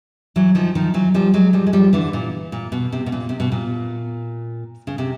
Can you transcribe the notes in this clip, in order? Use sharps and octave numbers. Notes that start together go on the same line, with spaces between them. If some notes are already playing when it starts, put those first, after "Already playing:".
E3 F#3
D#3 F3
D#3 F3
E3 F#3
F3 G3
F#3 G#3
F3 G3
G#3
F3 G3
D3 E3
A#2
A#2
B2
C3
B2
A#2
C3
B2
A#2
C#3
C3